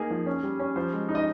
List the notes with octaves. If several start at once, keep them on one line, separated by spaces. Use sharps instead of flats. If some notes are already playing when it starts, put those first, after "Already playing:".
Already playing: A#3 D#4 G#4
F3
C#4
G3
C#4
F3 C5
G#3
D#4
D#5